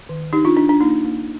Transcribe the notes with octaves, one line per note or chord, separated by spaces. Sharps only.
D#3
D4 D#4 G4
D4 F4
D4
D4
A#3 D#4
A#3